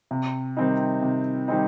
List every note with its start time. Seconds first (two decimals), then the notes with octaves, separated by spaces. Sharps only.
0.11 C3
0.57 D#3 G3 C4 D#4
1.02 C3
1.48 D#3 G3 C4 D#4